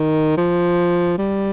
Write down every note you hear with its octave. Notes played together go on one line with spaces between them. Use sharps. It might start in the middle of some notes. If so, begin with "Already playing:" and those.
Already playing: D#3
F3
G3